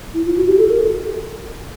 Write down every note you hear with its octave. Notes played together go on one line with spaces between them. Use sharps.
E4
F4
F#4
G4
A4
A#4